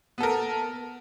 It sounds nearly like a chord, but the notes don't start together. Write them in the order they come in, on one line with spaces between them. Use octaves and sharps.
B3 A4 A#4